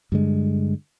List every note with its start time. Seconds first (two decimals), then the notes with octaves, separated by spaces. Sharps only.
0.12 G2 D3 G#3